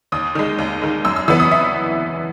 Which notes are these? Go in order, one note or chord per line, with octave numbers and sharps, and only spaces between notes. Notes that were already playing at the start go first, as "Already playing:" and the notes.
D#2 D#6
D#3 G#3
D#2
D#3 G#3
F#2 E6
E6
E3 B3 E6
D#6
E5